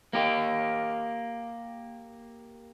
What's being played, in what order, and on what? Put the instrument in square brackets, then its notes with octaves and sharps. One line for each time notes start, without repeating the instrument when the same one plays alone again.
[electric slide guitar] A#3 G4